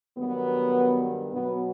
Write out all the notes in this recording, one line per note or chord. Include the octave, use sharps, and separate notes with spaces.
G2 D#3 F#3 B3
B2 F#3 B3